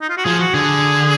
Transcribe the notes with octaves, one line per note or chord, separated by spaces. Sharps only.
D#4
F4
F#4
F3 G#4
F#4
D3 G#4